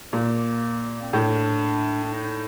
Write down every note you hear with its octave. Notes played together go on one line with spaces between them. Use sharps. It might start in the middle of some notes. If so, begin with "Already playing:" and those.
A#2 A#3
C4
A2 D4
D4
D#4